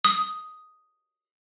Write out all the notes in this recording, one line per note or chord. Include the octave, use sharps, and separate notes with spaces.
D#6